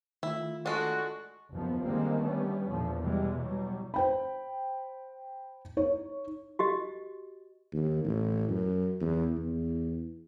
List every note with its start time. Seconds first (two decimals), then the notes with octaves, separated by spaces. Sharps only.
0.23 D#3 A3 E4 F4
0.66 G#3 D4 F#4 A4 C#6
1.52 F#1 D#2 F3 B3
1.82 D3 D#3 G3 G#3 A#3 C4
2.23 G3 A3 B3 C#4
2.67 E2 A#2 D3 F3
3.01 B2 E3 G3 G#3
3.38 B2 F#3 G3
3.94 C5 G5 B5
5.77 D#4 C#5
6.59 F#4 G4 D#5
7.72 D#2
8.05 A1
8.49 F#2
9.00 E2
9.38 E2